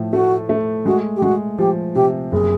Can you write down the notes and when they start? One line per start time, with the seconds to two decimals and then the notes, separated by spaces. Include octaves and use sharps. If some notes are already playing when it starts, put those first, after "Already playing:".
Already playing: A2 F3
0.13 A3 F#4
0.49 A3
0.86 G#3 F#4
1.16 G4
1.22 G#3 F#4
1.58 F3 G4
1.95 C3 G4
2.32 F#1 G#4